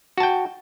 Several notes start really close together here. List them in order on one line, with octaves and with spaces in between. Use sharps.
F#4 A5 G5